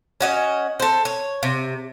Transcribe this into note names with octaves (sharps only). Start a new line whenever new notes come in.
C#4 F#4 D#5
A4 C5
C#5
C3